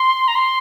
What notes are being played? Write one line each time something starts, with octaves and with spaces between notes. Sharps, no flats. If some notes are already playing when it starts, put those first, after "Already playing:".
Already playing: C6
A#5
C6